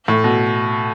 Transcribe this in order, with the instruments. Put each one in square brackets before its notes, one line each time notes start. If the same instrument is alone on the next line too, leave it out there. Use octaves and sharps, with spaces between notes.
[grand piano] A2
B2